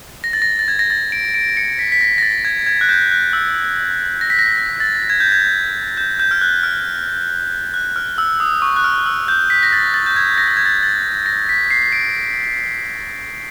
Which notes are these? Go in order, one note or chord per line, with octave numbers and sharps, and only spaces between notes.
A#6
A6
A#6
A6
G#6
A#6
A6
D7
D7
C#7
B6
B6
A#6
A#6
A6
G#6
G#6
F#6
G6
F#6
E6
A#6
B6
A#6
A6
G#6
G6
G#6
G6
G6
F6
F#6
F6
F#6
F6
E6
D#6
C#6
F#6
F6
E6
G6
B6
A#6
A6
A6
G6
G#6
A#6
A6
G#6
A6
A6
A#6
B6
C7
D7